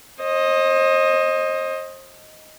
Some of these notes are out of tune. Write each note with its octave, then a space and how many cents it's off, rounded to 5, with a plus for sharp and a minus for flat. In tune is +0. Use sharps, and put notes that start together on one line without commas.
C5 +35 D#5 +0